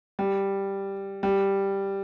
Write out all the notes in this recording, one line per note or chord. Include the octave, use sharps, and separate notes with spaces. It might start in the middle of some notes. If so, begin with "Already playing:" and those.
G3
G3